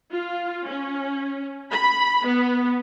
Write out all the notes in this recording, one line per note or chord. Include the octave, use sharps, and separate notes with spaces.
F4
C#4
B5
B3